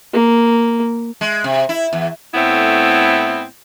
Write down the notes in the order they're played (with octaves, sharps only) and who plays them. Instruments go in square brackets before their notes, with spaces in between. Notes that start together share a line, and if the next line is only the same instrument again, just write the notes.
[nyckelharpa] A#3
[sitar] G#3
C3
E4
E2
[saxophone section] A2 A3 B3 C4 E4